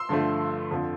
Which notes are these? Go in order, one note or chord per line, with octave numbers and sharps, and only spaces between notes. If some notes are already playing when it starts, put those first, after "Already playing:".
Already playing: C6 E6
G2 D3 F3 A3
F2 D3 F3